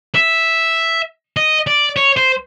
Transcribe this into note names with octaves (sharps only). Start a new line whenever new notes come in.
E5
D#5
D5
C#5
C5